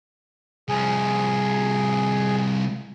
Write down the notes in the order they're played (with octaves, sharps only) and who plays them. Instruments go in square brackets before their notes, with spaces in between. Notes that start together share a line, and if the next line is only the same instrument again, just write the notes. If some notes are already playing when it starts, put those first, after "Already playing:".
[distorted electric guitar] C2 F3 [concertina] G#4